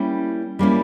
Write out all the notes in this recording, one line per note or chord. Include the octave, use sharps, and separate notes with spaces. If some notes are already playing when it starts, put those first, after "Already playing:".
Already playing: G3 A#3 C#4 E4
G3 A#3 C#4 E4